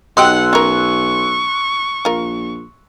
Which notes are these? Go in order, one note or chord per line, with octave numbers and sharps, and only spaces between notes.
B1 D#4 G4 F#5 G5 C6 E6 F#6
C#4 A#4 C#6
A#1 F4 A#4